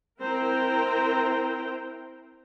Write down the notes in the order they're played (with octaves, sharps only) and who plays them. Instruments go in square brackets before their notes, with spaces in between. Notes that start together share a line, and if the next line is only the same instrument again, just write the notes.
[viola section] C4 E4 A#4 C5 G5 A#5